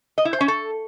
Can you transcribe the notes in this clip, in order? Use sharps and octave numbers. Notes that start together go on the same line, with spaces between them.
D#5
E4
C5
C#4
A4